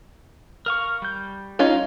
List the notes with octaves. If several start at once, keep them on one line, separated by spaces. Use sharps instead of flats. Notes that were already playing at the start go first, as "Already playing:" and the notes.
A#4 F5 C#6
G3 G6
C#4 D#4 F4